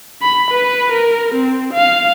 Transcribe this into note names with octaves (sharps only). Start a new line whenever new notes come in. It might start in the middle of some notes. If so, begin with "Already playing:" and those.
B5
B4
A#4
C4
F5